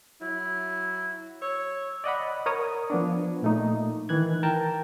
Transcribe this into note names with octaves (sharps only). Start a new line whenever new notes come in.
F#3 E4
C#5 E6
D5 D#5 F#5 B5
A#4 C#5 D#6
F3 B3 D4
A#2 A3 D#4
D#3 E3 F#6 G#6
A#4 G5 A5 A#5